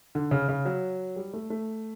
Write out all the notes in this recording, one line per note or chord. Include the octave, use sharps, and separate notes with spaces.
D3
C#3
C#3
F#3
G3
A3
A3